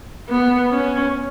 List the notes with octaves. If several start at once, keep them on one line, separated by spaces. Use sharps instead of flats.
B3
C#4